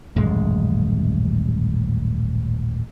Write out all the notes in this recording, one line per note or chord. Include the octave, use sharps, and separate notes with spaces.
D#1 A1 F#2 G#3